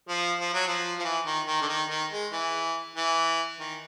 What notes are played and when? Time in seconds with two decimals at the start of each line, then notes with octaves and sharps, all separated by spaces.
0.09 F3
0.40 F3
0.54 F#3
0.67 F3
0.99 F3
1.04 E3
1.26 D#3
1.46 D#3
1.61 D3
1.68 D#3
1.89 D#3
2.11 G#3
2.32 E3
2.96 E3
3.60 D#3